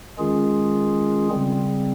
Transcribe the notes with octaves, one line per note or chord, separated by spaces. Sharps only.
D#3 G#3 C#4 F4 G#4
C#3 G3 C4